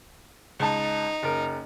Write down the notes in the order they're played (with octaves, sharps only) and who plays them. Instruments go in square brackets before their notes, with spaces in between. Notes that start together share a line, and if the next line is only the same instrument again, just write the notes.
[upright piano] C#2 A5 [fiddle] D#4
[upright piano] F#1 A#4